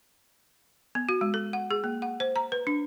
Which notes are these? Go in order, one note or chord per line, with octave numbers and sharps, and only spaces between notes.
B3
F#4
G#3
A4
F#5
G#4
A#3
F#5
C5
A#5
B4
D4